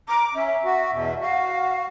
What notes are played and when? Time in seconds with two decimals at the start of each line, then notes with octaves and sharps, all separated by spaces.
0.08 A#5 D6
0.35 C#4 E5
0.65 F#4
0.92 E2 B2
1.21 F#4 F5